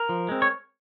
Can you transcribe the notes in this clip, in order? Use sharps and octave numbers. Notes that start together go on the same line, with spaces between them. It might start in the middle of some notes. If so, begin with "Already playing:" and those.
Already playing: A#4
F3
G#3 C4
C#5